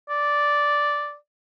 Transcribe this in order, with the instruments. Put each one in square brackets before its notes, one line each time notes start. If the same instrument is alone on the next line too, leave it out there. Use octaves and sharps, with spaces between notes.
[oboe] D5